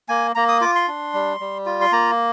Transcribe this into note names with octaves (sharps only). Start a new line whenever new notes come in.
A#3 G#5
A#3 A#5
D#6
F4 D6
C6
D4
G3
G3
F4
C6
A#3 A#5